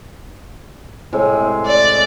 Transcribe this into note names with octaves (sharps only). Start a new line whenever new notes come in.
A2 C3 G#3
D5